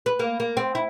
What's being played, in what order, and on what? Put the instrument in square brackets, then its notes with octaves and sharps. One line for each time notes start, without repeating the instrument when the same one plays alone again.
[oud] B4
A#3
A#3
C4
E4